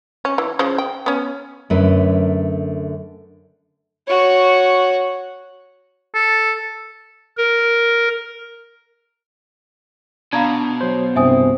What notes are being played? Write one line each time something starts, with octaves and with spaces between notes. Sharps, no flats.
C#4
E3
C#3 F3
G5
B3 C#4
F#2 D3 F#3 A3 B4
F#4 C#5
A4
A#4
B2 D4 F5 A#5 B5 G#6
F#3 C5
C2 G2 C4 E5 G#5 D#6